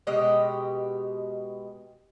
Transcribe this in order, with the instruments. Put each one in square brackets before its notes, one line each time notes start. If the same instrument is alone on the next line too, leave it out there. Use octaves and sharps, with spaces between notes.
[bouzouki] B2 G#3 G4 D#5